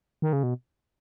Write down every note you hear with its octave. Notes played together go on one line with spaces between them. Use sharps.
D#3
C#3
B2